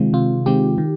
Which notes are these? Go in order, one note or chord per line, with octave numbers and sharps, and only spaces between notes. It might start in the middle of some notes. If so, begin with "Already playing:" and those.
Already playing: C3 D#3 G#3 C4 F4
C3 F4
D#3 G#3 C4 G4
D#3